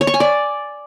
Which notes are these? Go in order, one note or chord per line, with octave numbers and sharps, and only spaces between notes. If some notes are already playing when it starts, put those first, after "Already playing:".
C#5
C#6
G#5
D5